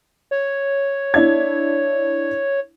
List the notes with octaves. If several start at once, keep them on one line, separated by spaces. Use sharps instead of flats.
C#5
D4 E4 G#6